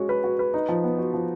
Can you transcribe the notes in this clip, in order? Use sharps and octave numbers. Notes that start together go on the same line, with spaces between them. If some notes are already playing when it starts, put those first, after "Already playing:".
Already playing: G#3 C#4 F#4
B4
F#4
B4
D#4
F3
B3
F#4
F3